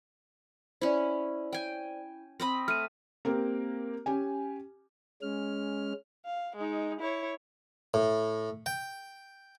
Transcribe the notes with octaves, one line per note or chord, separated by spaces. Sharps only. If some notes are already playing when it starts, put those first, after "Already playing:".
C#4 E4 C5 D5
G5 G#5
C4 D#5 B5
A3 F6 D#7
A#3 C4 G4 A#4
C#4 G4 G#5
G#3 C#4 F6
F5
G#3 D#4
E4 C#5
A2
G5